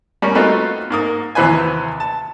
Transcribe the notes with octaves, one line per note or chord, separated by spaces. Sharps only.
G3 A#3 C#4
A3 B3 C4 D#4 F4 F#4
G#2 A#3 D#6
D#2 C3 E3 B4 C5 G#5
A5